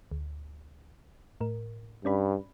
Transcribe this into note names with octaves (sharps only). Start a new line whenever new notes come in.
D2
A2 A#4
G2 C#4 D5 B5